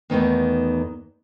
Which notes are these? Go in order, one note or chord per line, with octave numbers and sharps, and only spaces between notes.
E2 D#3 A3 B3